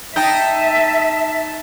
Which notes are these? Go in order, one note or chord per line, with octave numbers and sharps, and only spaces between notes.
D#4 E5 G5 A5